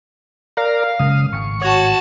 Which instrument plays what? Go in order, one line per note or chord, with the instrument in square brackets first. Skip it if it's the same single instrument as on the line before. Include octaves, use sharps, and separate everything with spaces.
[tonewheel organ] A#4 D5 A#5 [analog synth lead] F5
[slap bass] F#1 G#3 [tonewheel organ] C#3 D#6
[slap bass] G#1 A2 [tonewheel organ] C#6
[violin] F#4 A5 [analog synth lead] C#5